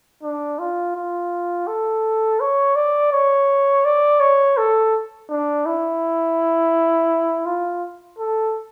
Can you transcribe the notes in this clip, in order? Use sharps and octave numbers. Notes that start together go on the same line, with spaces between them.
D4
F4
F4
A4
C#5
D5
C#5
D5
C#5
A4
D4
E4
F4
A4